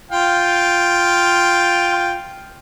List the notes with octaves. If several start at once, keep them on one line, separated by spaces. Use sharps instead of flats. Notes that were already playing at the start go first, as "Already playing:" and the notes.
F4 F5 G5